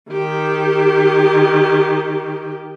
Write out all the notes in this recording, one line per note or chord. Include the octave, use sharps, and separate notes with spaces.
D#3 G4